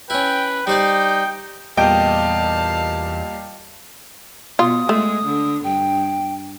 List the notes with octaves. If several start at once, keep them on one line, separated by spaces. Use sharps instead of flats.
C#4 E4 B4 G5
G3 D#4 C5 D5 G5
E2 A#2 G3 D#5 F5 G5 A5
B2 F4 D#6
G#3 A3
D3
G2 G5